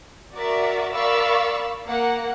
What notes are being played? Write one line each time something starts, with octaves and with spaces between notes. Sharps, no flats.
F#4 A#4 D5 E5
A#4 D5 F5 B5 C#6 E6
A#3 A#4 F#5